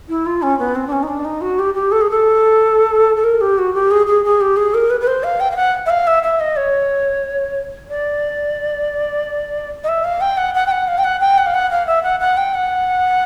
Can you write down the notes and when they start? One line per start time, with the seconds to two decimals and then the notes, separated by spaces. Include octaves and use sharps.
0.09 E4
0.26 F4
0.42 C#4
0.59 B3
0.75 C4
0.87 D4
0.92 C#4
1.03 D#4
1.08 D4
1.24 D#4
1.41 F#4
1.59 G4
1.74 G4
1.91 A4
2.01 G#4
2.10 A4
3.16 A4
3.24 A#4
3.41 G4
3.58 F#4
3.74 G4
3.91 G#4
4.06 G#4
4.24 G#4
4.40 G4
4.56 G#4
4.74 A#4
4.90 B4
5.00 B4
5.07 C5
5.23 F5
5.40 G5
5.51 F5
5.56 F#5
5.86 E5
5.89 F5
6.07 E5
6.23 E5
6.39 D#5
6.56 C#5
7.89 D5
9.83 D#5
9.88 E5
10.04 F5
10.20 G5
10.37 F#5
10.54 F#5
10.66 G5
10.71 F#5
10.87 F5
10.98 G5
11.04 F#5
11.20 G5
11.38 F#5
11.46 F5
11.54 F#5
11.71 F5
11.86 E5
12.03 F#5
12.20 F#5
12.37 G5
12.54 F#5